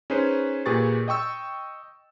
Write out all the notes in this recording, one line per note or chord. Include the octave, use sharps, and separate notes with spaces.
C#4 D#4 G#4 B4 C5
A#2 G4 G#4 B4 C#6 A6
D#5 G5 C#6 E6